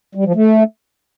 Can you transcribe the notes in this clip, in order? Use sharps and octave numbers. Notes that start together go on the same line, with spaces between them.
G3
F3
A3